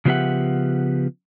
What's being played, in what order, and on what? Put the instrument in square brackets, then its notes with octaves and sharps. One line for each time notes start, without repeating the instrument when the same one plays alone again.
[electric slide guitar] C#3 F3 B3 G4 E5 F#5